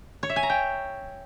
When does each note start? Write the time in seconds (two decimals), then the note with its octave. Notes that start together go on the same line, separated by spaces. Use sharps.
0.23 C#5
0.29 E5
0.36 G#5
0.43 A#5
0.50 G5